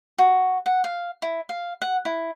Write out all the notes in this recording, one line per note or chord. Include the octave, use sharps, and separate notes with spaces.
F#4
F#5
F5
E4
F5
F#5
E4